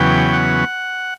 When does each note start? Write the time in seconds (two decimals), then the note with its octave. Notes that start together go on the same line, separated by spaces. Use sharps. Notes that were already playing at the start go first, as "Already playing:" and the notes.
Already playing: E2 C#3 F#3 B3 G5
0.33 F#5